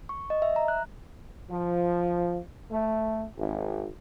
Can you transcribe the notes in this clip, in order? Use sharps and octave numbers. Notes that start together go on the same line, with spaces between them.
C#6
D#5
E5
A#5
F#6
F3
A3
G#1